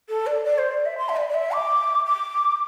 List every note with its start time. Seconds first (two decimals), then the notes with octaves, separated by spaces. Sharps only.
0.09 A4
0.27 D5
0.45 D5
0.58 C5
0.71 D5
0.85 E5
0.98 C6
1.09 E5
1.16 D5
1.29 D5
1.34 E5
1.52 D6
2.06 D6